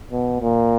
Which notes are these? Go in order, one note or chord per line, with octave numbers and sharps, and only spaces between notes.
B2
A#2